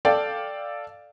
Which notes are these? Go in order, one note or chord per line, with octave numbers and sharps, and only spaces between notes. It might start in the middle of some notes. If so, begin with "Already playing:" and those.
A4 D5 F5 G5